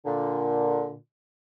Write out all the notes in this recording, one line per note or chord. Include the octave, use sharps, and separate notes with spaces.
A#2 D3